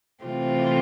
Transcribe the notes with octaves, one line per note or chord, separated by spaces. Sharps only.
C3 E3 A3 C4 F4